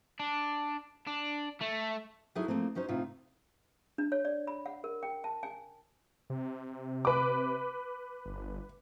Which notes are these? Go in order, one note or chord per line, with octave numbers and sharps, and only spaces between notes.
D4
D4
A3
F#3 D#4 E4 G#4 A4
F3 F#3 A3 A#3 C4
F#3 C#4 D#4 C5
A2 C3 D#4 F4
D4
C#5
D5
B5
F#5
A#4
G5
A5
G#5
C3
B4 D6
G1